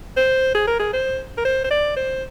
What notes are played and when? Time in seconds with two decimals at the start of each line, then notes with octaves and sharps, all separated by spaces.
0.17 C5
0.55 G#4
0.67 A#4
0.79 G#4
0.93 C5
1.38 A#4
1.45 C5
1.64 C5
1.71 D5
1.96 C5